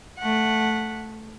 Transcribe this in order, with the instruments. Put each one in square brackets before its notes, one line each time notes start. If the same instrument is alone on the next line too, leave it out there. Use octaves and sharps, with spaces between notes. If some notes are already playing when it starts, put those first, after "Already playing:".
[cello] A3 F#5